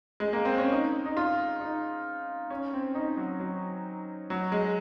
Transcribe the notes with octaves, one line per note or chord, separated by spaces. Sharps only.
G#3
A#3
C4
C#4
D#4
D#4
F4
D#4
C#4
C4
D#4
F#3
F#3
F#3
G#3